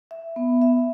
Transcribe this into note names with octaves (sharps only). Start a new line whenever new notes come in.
E5
B3
E5